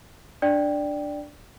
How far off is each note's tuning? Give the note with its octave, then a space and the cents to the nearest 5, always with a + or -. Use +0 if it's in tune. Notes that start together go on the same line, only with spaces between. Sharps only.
D4 +0 D5 +0 G5 +0